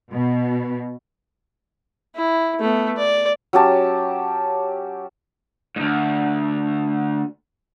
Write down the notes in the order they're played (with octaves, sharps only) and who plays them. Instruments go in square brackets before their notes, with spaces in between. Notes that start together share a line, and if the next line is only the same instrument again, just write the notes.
[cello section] B2
[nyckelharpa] E4
A3 B3
D5
[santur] F#3 C#4 G4 A5
[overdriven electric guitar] D2 G#2